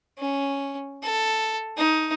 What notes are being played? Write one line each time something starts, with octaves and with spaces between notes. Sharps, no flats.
C#4
A4
D#4